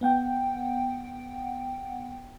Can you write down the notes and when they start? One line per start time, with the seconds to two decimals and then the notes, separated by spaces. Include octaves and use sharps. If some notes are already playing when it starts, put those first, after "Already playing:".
0.01 B3 F#5 G5